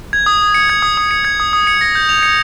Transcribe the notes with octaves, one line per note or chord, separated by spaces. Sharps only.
G#6
D#6
D#6
C#7
G#6
D#6
D#6
C#7
G#6
D#6
D#6
C#7
A#6
G6
F7
C#7